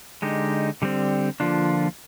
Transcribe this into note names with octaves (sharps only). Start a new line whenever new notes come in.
D3 G#3 D#4 G4
D3 G3 C4
D3 F3 A#3 D4 F4